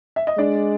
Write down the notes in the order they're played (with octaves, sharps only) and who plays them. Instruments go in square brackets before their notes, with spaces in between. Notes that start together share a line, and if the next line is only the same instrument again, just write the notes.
[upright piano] E5
D#5
[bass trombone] G#3 [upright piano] D4 D5